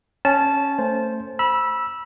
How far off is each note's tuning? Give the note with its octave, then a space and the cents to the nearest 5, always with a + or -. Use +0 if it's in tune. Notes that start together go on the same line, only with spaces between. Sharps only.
C#4 +0 A5 -15
A3 +25 C5 +0
B5 -25 E6 +0